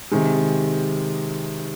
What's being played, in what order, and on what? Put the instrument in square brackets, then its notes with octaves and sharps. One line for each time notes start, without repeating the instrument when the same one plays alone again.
[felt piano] C3 D#3 G#3